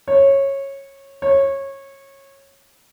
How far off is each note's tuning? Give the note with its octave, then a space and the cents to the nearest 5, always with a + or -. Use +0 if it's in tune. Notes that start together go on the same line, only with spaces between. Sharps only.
C#5 -15
C#5 -20